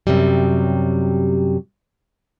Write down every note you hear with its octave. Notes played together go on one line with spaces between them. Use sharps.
F#2 C3 F#3 G3